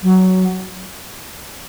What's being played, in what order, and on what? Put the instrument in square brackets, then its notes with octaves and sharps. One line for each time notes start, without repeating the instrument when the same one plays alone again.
[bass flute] F#3